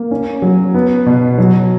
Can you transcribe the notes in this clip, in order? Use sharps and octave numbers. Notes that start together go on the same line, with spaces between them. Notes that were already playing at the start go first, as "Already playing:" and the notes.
Already playing: A#3
C#4
F#3
B3
B2
F#3